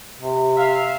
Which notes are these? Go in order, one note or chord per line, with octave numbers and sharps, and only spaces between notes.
C3
E5 F5